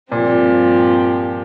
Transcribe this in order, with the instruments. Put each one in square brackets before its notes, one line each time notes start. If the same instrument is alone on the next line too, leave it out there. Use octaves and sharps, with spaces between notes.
[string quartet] G2 F3 C4 G4 [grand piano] A#2